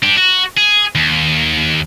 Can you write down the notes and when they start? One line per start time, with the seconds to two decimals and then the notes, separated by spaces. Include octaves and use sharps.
0.04 D4 G4
0.17 F#4
0.58 G#4
0.95 D#2